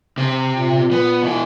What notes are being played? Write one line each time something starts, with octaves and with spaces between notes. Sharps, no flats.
C3
A#2
B3
B2 E4